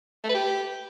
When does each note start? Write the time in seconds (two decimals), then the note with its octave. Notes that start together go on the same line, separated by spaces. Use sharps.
0.24 A3
0.29 B4
0.34 G4